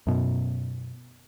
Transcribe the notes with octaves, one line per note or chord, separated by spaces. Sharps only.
F#2 B2